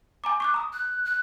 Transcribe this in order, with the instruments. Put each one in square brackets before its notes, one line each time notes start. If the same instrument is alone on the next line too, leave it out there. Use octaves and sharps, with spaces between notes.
[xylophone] G#5 A#5 D6
C#6 D6 F#6
A#5 D#6
[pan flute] F#6
F#6